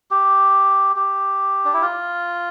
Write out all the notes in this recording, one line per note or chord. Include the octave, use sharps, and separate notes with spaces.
G4
G4
D4
E4
F4